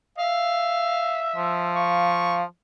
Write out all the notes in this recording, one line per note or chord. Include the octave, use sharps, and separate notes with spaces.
E5 F5
F3
F5 C#6